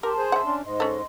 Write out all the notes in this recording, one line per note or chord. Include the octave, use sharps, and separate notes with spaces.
G4 A#4 A5 C6
G#4 C5
E5 F#5
C#4 D4
G#2 D#5 C6
C#4 A4